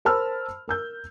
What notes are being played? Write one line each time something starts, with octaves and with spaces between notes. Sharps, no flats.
A#4 C5 A5 B5 E6 F6
A#4 E6 G6